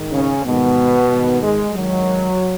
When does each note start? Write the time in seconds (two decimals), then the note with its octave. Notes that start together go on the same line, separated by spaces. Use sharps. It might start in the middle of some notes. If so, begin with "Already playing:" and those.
Already playing: G#2 D#3
0.11 C#3 C#4
0.44 G#2 B2 D#3 B3
1.10 G#2 D#3
1.42 G#3
1.75 G#2 D#3 F#3